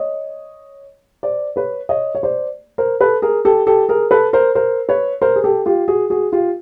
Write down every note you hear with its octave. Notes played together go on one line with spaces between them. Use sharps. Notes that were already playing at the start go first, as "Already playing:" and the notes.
Already playing: C#5 D#5
C5 D5
B4 C#5
C#5 D#5
C#5
C5 D5
A#4 C5
A4 B4
G#4 A#4
G4 A4
G4 A4
G#4 A#4
A4 B4
A#4 C5
A#4 C5
B4 C#5
A#4 C5
G#4
G4 A4
F4 G4
F#4 G#4
F#4 G#4
F4 G4